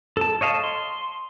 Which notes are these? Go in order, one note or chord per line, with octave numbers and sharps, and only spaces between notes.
A4 A5
C#5 D#5 F5 A5
C6